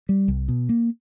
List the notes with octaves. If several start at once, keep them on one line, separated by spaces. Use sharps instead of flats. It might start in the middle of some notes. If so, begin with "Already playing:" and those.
G3
C2
B2
A#3